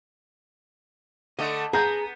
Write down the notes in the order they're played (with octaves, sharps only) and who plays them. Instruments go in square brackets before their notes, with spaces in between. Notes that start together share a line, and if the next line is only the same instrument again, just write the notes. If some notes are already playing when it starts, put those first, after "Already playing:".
[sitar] D3 A3 [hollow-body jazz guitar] D#5
[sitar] B3 [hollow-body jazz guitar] G#4 [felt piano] A#5 G6